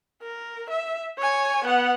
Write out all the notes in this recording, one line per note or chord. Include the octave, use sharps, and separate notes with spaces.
A#4
E5
C#5 G#5
B3 F#5